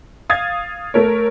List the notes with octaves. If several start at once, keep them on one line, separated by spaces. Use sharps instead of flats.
F5 D#6 G#6 A6
A3 A#4 C#5